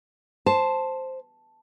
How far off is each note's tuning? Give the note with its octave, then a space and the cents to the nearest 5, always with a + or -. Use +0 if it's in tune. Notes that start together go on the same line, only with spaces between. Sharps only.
C5 +0 A5 +0